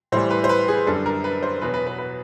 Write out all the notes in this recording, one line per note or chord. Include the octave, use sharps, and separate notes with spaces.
A2 E3 G3 C5
B4
C5
B4
G#4
F#2 D3 G3 A4
A#4
B4
C5
E2 B2 F#3 B4
B4
B4
B4